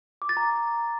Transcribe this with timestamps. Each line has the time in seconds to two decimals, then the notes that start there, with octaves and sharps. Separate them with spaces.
0.22 D6
0.29 A6
0.37 A#5